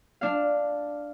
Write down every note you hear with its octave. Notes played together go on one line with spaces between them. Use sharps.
D4 F5